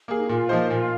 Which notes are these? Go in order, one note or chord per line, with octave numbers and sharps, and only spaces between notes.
A#3 G#4
D#4
A#2 F4
F3 A#3 D#4 C5
A#2